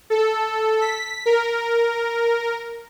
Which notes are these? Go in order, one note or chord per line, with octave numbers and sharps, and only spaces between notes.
A4
B6
A#4